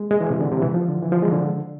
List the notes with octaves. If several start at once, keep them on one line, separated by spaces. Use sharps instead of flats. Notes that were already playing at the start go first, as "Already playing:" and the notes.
Already playing: G#3
G#3
E3
C3
D3
C3
E3
F3
D3
E3
F3
G#3
D3